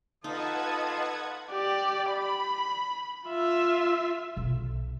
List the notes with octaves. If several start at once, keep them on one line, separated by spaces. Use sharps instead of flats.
D#4 F4 A4 B4 D#5 F#5 A5 G#6
G4 D5
B5
F4 E5
B1